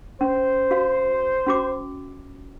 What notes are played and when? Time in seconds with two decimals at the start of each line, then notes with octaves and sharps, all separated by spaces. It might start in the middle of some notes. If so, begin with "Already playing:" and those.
0.21 C#4 C5
0.71 F#4 F5
1.47 C#4 F#4 D6